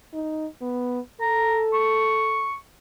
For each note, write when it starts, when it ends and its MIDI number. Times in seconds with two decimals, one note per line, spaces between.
0.14 0.47 63
0.62 1.00 59
1.21 2.48 69
1.21 1.61 82
1.74 2.56 85